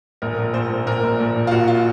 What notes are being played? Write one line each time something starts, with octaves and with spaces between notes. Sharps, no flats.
A#1 A#4
A#2
A#2 C5
A#2
A#2 A#4
A#1
A#2
A#1
F4
A#1 F#4
F4